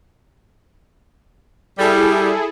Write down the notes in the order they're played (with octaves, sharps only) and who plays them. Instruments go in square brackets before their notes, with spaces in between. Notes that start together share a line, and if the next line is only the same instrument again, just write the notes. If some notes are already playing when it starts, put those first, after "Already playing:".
[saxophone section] G3 [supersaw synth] E4 G#4 A4